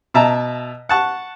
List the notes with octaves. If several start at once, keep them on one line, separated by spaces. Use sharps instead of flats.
B2 E5 A5 A#5
F#5 A5 C#6